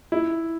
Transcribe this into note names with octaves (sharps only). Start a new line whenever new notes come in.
E4